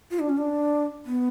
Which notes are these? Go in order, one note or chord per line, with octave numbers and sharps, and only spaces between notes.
F4
D4
C#4
D4
B3